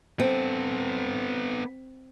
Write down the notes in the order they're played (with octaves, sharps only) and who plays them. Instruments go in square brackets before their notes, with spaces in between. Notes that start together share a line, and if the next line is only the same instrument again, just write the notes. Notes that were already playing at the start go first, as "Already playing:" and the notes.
[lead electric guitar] B3 A4 [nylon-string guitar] C4